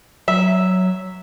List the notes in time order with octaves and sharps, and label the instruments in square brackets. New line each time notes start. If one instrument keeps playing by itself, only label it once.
[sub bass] F#3 [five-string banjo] E5